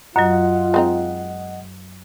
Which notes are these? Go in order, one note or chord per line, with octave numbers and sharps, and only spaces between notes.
F#2 F#3 F4 D#5 F#5
G#3 C4 D#4